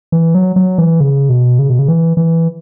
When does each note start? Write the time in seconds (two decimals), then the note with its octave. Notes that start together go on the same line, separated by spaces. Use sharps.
0.12 E3
0.35 F#3
0.56 F#3
0.78 E3
1.01 C#3
1.29 B2
1.59 C#3
1.70 B2
1.79 C#3
1.88 E3
2.17 E3